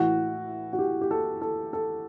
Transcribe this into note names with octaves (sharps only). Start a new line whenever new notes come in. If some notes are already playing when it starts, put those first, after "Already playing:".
Already playing: A2 E3 F#4
F#4
G4
G4
A4
A4
A4